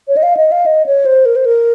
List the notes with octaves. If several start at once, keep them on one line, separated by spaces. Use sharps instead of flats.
C#5
D#5
F5
D#5
F5
D#5
C#5
C5
A#4
C5
A#4